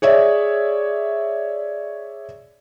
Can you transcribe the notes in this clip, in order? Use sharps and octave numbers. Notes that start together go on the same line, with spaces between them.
G#4 C#5 D5 E5